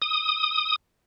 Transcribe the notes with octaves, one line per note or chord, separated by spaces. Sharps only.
D#6